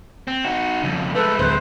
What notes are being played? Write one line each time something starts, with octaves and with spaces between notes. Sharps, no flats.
C4
D#4 F#4
F2 C#3
G#3 A3 A4 B4
D1 C5